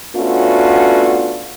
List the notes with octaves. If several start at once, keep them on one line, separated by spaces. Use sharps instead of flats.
A3 B3 C#4 D4 F4 F#4